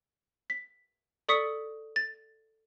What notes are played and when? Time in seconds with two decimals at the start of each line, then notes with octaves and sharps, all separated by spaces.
0.50 B6
1.29 A4 D5 C#6 D#6 B6 C#7
1.96 A6